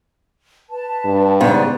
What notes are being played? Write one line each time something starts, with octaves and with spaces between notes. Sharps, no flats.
B4 A5
G2
G#2 C#3 B3 D5